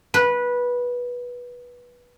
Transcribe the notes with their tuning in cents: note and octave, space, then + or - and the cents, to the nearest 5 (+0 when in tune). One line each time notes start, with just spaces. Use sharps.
B4 -15